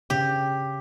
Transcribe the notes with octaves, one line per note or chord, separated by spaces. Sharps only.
C#3 G4